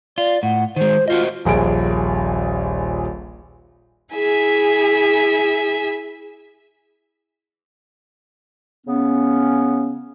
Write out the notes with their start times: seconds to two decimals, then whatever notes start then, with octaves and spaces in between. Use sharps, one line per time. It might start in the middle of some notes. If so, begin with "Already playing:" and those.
0.18 F4 D5
0.43 A2 F#5
0.76 D#3 G#3 C5
1.08 F4 F#4 C5 D#5
1.45 D#1 A#1 G#4 D7
4.14 E4 G#4 E5 G#5
8.86 C#3 B3 C#4